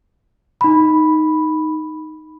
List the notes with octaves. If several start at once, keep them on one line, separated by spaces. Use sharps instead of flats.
D#4 B5